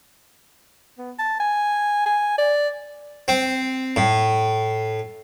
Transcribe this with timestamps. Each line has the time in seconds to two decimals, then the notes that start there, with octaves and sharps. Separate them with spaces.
0.98 B3
1.19 A5
1.40 G#5
2.06 G#5
2.38 D5
3.28 C4
3.96 A2